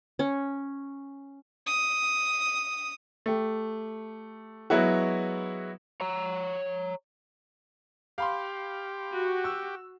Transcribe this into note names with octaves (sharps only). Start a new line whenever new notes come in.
C#4
D#6
A3 G4
F#3 G#3 B3 E4 F#4
C#5 A#5
G4 F5 B5 C6
F#4
E6